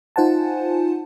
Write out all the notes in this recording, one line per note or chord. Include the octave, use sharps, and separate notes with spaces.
D#4 F4 C5 F#5 G#5 A5